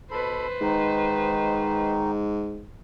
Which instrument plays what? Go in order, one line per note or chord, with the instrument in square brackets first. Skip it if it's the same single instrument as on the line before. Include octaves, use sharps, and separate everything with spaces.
[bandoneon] B2 A4 B5 [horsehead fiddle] B4 C5
[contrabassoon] G#2 [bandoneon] D#3 D#4